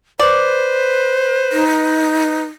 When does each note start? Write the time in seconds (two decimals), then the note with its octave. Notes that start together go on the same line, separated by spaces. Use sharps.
0.19 B4 C5 D5
1.52 D#4